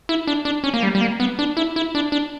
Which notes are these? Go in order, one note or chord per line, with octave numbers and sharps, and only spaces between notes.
E4
D4
D4
C#4
A#3
G3
G3
A#3
B3
D4
E4
E4
D4
D4